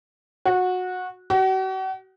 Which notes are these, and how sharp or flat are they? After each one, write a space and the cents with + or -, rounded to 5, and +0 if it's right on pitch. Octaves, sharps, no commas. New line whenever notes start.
F#4 -20
F#4 +40